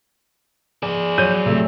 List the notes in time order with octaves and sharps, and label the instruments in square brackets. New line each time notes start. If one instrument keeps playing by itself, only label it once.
[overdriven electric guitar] G#4 D5
[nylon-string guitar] F#3 [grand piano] G6 D#7
[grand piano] C3 A3